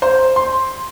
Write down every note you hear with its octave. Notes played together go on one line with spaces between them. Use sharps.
C5
C6